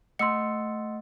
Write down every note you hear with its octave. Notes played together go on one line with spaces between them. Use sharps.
A3 D#5 F#5 C6 E6 C#7